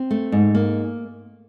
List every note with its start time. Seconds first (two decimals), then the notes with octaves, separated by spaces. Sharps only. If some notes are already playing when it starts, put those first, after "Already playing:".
Already playing: C4
0.11 A3
0.32 G#2
0.55 A#3